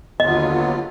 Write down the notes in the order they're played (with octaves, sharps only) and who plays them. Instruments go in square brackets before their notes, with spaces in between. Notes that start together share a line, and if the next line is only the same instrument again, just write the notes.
[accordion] D#2 D3 F#3 B3 F4 [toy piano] D#5